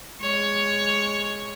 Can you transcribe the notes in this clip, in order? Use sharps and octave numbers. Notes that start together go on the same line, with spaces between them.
G#3 C#5